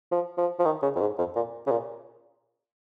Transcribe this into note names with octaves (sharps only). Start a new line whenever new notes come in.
F3
F3
F3
D#3
C#3
F2
G#2
F2
A#2
C#3
A#2